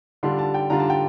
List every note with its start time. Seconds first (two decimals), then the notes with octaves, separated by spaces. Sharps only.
0.23 D3 G3 D4 F4 C6
0.39 A5
0.54 G5
0.70 D3 G3 D4 F4 A#5
0.80 A5
0.90 G5